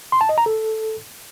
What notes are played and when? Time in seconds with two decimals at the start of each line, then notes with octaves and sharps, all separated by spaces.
0.12 C6
0.21 A5
0.29 D#5
0.38 A#5
0.46 A4